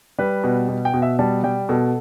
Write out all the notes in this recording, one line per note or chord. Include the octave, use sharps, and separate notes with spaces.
G3 B4
B2
B2
G5
B2
E5
G3 A5
G3 G5
B2 A4